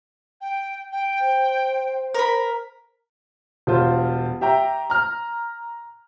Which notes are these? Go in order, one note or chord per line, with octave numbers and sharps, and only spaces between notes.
G5
G5
C5
A#4 B5
E1 G3 F4 C5
G4 E5 G5 A#5
A#5 F6